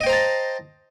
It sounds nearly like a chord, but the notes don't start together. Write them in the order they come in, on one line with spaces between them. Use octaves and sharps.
D#5 G5 C5 A#5 A5